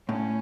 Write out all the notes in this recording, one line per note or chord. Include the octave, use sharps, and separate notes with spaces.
A2 C#4